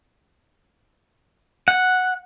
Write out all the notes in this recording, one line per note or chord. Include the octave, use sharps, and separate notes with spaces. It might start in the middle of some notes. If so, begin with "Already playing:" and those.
F#5